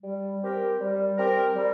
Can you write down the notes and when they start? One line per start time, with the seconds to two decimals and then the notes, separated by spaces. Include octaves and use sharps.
0.02 G3
0.41 C4 G4 A#4
0.79 G3
1.17 C4 G4 A#4
1.55 G3